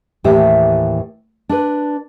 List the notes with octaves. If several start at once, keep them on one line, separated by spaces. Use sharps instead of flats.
D#2 A2 E3 G4 C5 E5
D4 B4